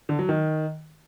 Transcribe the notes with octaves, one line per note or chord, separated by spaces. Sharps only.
D3
F#3
D#3